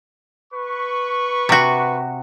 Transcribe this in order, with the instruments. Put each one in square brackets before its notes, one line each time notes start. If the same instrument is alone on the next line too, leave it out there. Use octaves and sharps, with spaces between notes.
[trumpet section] B4 C#6
[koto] C3 F#4